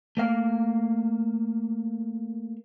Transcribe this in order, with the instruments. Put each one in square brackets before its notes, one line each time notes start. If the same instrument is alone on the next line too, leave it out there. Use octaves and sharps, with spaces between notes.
[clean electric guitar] A3 A#3 F5